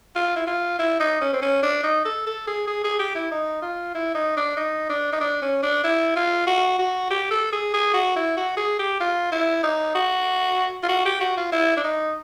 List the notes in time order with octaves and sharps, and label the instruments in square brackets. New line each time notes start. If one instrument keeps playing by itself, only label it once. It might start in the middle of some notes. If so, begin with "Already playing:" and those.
[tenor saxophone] F4
E4
F4
E4
D#4
C#4
C4
C#4
D4
D#4
A4
A4
G#4
G#4
G#4
G4
E4
D#4
F4
E4
D#4
D4
D#4
D4
D#4
D4
C#4
D4
E4
F4
F#4
F#4
G4
A4
G#4
G#4
F#4
E4
F#4
G#4
G4
F4
E4
D#4
F#4
F4
F#4
G4
F#4
F4
E4
D4
D#4